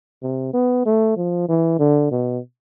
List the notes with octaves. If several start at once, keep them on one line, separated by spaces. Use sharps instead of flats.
C3
B3
A3
F3
E3
D3
B2